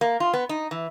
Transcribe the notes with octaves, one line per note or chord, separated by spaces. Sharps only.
A#3
F4
B3
D#4
E3